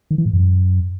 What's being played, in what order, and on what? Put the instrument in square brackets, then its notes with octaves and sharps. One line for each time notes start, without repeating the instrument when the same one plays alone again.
[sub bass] D#3
E3
A2
F#2